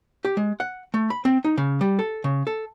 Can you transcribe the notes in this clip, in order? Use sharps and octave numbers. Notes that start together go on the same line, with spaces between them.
G4
G#3
F#5
A3
B5
C4
D#4
C#3
G3
A4
C#3
A4